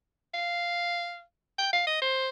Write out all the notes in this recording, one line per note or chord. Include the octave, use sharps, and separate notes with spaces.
F5
G5
F5
D#5
C5